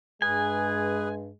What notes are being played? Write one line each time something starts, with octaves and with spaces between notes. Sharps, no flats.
G2 G#3 G#4 B4 G#5